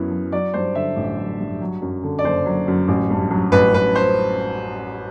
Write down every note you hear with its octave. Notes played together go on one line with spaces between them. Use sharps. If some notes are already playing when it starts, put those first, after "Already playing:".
Already playing: F#2 F#3 B3 E4
F#3
F#3 D5
G2 C5
D3 E5
A1
F#3
G2
F#3
F#2
D3
D5
F#1 C5
F#3
F#2
A1
G2
F#3
A1 B4
A1 B4
C5